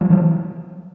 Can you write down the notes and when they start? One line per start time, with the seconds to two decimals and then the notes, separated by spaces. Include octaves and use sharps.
0.01 F3 G3
0.10 E3 F#3